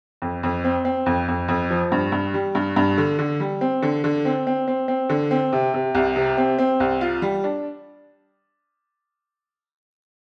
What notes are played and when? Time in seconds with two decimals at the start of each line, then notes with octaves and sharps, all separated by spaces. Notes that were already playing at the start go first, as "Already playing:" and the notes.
0.22 F2
0.43 F2
0.64 C4
0.85 C4
1.06 F2
1.28 F2
1.48 F2
1.70 F3
1.92 G2
2.12 G2
2.34 G3
2.55 G2
2.76 G2
2.98 D3
3.19 D3
3.40 G3
3.61 C4
3.82 D3
4.04 D3
4.25 C4
4.47 C4
4.68 C4
4.88 C4
5.10 D3
5.31 C4
5.53 C3
5.74 C3
5.95 C2
6.16 C3
6.37 C4
6.58 C4
6.80 C2
7.01 F4
7.22 G3
7.44 D4